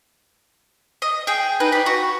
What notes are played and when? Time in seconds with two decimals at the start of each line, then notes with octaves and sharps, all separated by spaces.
1.02 D#5
1.27 G#4 G5
1.60 D#4 B4
1.72 G4 D5
1.86 F#4